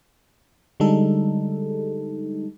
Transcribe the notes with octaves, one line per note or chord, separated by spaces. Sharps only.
D3 G3 G#3 D#4 A4